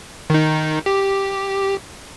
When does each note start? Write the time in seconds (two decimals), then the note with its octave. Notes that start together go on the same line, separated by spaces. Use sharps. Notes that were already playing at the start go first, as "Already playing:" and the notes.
0.30 D#3 D#4
0.86 G4